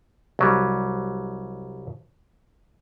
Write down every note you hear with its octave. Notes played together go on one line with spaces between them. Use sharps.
C2 F#3 G3